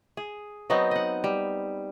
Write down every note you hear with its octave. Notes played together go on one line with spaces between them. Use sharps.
G#4
F#3 B3 C4 D#4
D#5 F#5
G3